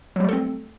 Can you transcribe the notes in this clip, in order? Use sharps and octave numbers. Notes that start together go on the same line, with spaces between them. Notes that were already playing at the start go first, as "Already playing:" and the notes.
F#3 G3 A3 C4 A4